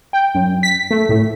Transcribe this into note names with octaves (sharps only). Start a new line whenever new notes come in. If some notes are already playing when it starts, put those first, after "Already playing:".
G5
F#2
B6
A3
A2